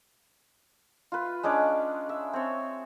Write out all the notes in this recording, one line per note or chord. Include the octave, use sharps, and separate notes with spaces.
F4 B4
G#3 C#4 D4 D6
E5
C4 C#5